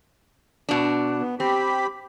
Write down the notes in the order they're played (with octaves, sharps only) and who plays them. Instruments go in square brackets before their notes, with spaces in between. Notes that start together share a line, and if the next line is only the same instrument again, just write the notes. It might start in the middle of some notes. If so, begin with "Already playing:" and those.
[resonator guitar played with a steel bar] B2 D4
[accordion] B3
[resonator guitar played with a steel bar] C4 [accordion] G4 B5